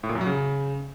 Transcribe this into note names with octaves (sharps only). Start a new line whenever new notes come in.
A2
A#2
F#2
F#3
C#3